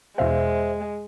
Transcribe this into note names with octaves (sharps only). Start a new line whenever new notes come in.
E2 B2 G#3 C5 E5 F5